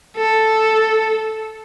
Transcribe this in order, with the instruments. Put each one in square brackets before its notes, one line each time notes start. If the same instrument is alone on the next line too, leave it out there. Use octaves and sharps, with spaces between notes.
[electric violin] A4